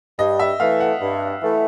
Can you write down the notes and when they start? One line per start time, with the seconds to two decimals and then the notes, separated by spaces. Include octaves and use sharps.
0.19 G2 D#5
0.40 E5
0.60 E3 A3 F5
0.80 F#5
1.01 G2
1.42 E3 A3